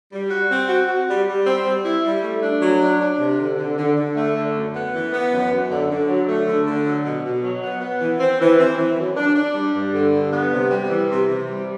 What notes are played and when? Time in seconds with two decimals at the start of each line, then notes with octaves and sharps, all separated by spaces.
0.11 G3
0.30 F#4
0.49 C4
0.69 F#4
0.88 F#4
1.07 G3
1.27 G3
1.46 C4
1.65 G3
1.84 E4
2.05 G3
2.23 A3
2.42 D4
2.61 F#3
2.81 D4
3.01 D4
3.19 C3
3.39 D3
3.58 D3
3.78 D3
3.96 D3
4.15 A3
4.35 D3
4.55 F#2
4.74 B3
4.93 E3
5.13 B3
5.31 F#2
5.51 F#2
5.70 D3
5.89 D3
6.09 F#3
6.28 A3
6.47 D3
6.66 D3
6.86 F#3
7.04 B2
7.24 B2
7.43 F#3
7.63 B3
7.81 B3
8.01 E3
8.20 C4
8.40 E3
8.59 C4
8.78 E3
8.98 F#2
9.17 D4
9.35 D4
9.55 G3
9.75 G2
9.93 D3
10.12 G2
10.32 B3
10.52 C3
10.70 G3
10.90 E3
11.10 C3
11.28 C3
11.48 G3